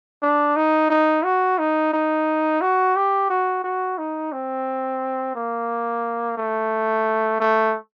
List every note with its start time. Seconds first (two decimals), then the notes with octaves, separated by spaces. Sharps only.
0.22 D4
0.56 D#4
0.90 D#4
1.24 F#4
1.59 D#4
1.93 D#4
2.61 F#4
2.96 G4
3.30 F#4
3.64 F#4
3.98 D#4
4.32 C4
5.35 A#3
6.37 A3
7.40 A3